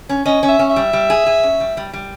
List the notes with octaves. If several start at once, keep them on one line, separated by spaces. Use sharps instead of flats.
C#4
C#4 D#5
C#4
E5
C#4
E5
G3
G3
G#4
G#4
C#4
G3
G3
G3